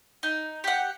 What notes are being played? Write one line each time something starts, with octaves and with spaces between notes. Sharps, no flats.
D#4
G4 F#5